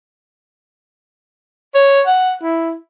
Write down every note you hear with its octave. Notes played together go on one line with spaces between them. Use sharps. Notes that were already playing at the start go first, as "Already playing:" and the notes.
C#5
F#5
E4